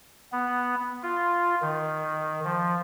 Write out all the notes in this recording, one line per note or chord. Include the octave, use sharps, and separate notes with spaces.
B3
F4
D#3
F3